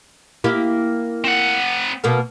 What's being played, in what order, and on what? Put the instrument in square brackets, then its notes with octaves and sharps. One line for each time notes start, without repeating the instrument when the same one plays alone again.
[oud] A#3 E4 G4
[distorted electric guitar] C4 F#5
[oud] B2 A#3 B3